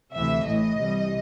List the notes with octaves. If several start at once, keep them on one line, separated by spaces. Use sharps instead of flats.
D2 C3 E3 A3 E5
A1 A2 E3 D#5
C2 C3 E3 G3